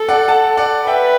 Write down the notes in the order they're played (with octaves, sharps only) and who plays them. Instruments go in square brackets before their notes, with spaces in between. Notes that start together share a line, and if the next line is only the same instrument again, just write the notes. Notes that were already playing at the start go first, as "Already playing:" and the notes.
Already playing: [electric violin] A4
[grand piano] D5 F#5
F#5 A5
D5 F#5
[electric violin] B4 [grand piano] E5 G5